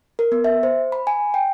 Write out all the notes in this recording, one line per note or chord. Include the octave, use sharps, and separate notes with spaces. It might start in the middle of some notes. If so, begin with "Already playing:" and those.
A#4
B3
E5
C5
B5
G#5
G5